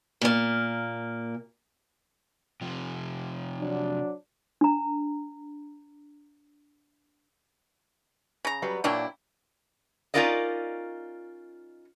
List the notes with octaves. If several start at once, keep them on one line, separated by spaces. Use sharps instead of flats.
A#2 A#3
C3 F3
F#3 D4
D4 A#5
C#3 A#5
F#3 G3 B4
A#2 F#3 A#3 D4 E4 G5
C#4 D#4 F4 A#4 D5 D#5